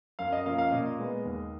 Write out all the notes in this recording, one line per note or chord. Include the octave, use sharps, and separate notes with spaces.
F#2 F5
D#5
F3 A#3 C#4 F5
F5
A#2 D#5
G#3 B3
D#2